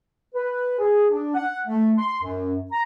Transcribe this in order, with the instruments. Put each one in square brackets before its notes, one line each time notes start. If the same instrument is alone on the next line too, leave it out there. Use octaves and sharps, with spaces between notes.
[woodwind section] B4
G#4
D4
F#5
A3
C6
F#2
A#5